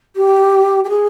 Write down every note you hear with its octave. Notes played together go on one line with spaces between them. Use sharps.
G4
G4
G#4